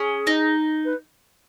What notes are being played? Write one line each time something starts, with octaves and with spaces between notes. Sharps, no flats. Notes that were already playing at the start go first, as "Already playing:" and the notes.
Already playing: C#4 G#4
D#4
B4